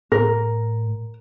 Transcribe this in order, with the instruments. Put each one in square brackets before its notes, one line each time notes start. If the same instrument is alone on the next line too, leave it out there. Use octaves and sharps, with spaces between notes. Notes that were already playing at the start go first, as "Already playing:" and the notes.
[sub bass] A2 [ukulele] A#4